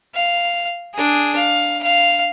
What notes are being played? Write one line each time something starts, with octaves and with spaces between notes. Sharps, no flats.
F5
D4 G#4
F5
F5